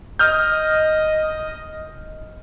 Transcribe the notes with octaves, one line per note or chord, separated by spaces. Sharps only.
D#5 D#6 F6 G6